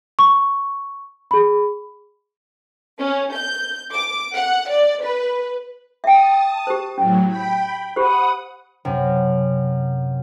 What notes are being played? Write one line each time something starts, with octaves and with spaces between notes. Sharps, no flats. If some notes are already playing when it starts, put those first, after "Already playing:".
C#6
G#4 B5
C#4
G6
D6
F#5
D5
B4
E5 G5 A5 D#6
G4 C5
A2 F#3 C#4
G5 B5
G4 C5 F#5 B5 D#6
F#2 C3